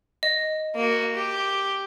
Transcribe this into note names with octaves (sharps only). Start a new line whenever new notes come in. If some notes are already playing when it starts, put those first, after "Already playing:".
D#5
A#3 F#4
G4